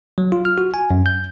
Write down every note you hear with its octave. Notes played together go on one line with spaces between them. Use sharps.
F#3
F4
F6
F#4
G#5
F#2
G6